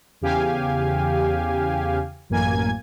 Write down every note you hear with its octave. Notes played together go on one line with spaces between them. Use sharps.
E2 C#3 G4 F5 G#5
A1 F#2 A#3 G#5 G#6